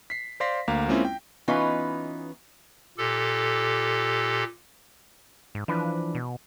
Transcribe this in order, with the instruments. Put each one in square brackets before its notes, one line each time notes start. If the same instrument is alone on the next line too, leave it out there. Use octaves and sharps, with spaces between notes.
[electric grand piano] B6 C7
C5 D5 F5 C6 A#6 B6
D2 A#3 F5 A#5
G#3 A#3 C4 C#4 E4 F4
G5
[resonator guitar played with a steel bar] E3 B3 C#4 D#4 F4 B4
[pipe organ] A#2 G4 A4
[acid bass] G#2
[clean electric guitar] E3 D4 B4 [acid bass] F3
[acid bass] B2